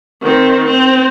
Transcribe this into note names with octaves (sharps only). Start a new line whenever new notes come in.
D#3 C4
C4